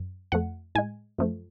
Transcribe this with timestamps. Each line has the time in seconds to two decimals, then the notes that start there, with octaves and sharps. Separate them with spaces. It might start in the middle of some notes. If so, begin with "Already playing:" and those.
Already playing: F#2
0.32 F2 F3 A3 F#5
0.75 A2 G#3 G#5
1.18 F#2 F3 A3